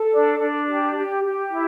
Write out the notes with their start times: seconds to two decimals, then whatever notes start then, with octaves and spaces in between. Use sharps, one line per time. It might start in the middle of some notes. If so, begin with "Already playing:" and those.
Already playing: A4
0.11 D4
0.39 D4
0.67 G4
0.95 G4
1.24 G4
1.52 E4